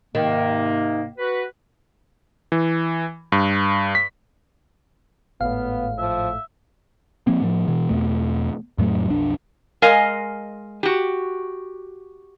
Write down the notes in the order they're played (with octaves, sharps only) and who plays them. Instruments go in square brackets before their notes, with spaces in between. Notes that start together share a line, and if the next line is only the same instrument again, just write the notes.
[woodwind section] G#2 C3 A#3 [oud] D#3
[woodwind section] F#4 B4
[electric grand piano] E3
G2
B6
[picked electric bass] G#1 A2 [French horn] B3 [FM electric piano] F5
[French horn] F3 [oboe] E5
[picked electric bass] F3 A#3 C4
A2 F3
B2 E3
E2 B2 A3
F2 A2 F#3 A3
B1 F2 D4
[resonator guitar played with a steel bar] G#3 A#4 D#5 F5 G#5
F#4 G4